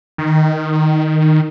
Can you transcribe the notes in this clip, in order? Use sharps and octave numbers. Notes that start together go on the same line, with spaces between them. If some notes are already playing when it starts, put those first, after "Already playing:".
D#3